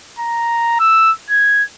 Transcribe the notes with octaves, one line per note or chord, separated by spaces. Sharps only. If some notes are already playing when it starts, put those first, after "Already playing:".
A#5
E6
G#6